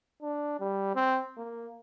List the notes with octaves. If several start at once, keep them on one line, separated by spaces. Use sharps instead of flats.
D4
G3
C4
A#3